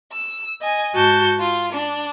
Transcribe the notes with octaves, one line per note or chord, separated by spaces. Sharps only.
E6
D#5 G#5
G#2 F#4 A5 G6
F4
D4